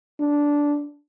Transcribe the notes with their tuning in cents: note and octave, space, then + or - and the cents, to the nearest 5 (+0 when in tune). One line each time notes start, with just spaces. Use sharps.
D4 -10